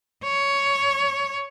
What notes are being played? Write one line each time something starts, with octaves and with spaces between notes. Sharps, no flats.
C#5